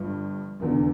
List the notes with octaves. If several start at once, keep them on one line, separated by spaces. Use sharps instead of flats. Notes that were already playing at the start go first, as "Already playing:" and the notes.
Already playing: G1 G2 F3
F1 E2 D3